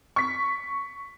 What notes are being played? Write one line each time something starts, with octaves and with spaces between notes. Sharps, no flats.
C#6 B6